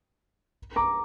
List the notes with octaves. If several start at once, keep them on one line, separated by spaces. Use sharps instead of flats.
A#5 D6